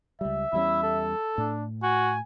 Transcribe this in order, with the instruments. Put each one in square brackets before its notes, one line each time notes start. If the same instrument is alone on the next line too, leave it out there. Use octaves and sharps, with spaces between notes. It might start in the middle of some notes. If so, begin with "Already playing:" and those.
[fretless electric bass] C#2 G3 [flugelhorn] E5
[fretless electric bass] E2 G3 C#4 [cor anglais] E4
[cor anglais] A4
[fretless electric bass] A2 [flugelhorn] D4
[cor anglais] F#4 [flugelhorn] G#5